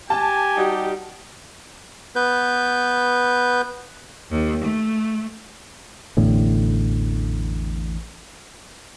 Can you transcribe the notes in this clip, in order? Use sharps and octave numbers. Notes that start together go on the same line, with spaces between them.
G4 G#5 A5
G3 D#4 F#4
B3 B4 G6
D#2
A3
A1 E2 A2 D3